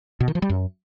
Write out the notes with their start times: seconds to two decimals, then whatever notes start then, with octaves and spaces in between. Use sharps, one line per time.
0.20 B2
0.28 D#3
0.35 F3
0.42 G3
0.50 F#2